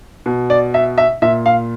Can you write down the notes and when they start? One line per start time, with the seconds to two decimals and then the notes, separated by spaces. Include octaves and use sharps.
0.26 B2
0.50 D5
0.74 E5
0.98 E5
1.22 A#2 E5
1.46 F5